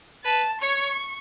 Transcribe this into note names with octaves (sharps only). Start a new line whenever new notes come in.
B4 A5
C#5 C#6